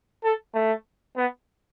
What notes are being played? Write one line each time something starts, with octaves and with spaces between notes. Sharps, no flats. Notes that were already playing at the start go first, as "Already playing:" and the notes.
A4
A3
B3